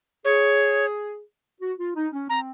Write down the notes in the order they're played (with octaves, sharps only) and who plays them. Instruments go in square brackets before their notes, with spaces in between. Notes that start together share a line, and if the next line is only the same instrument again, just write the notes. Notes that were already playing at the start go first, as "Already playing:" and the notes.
[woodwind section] G#4 [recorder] C#5
[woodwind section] F#4
F4
D#4
C#4
[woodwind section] C4 [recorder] A#5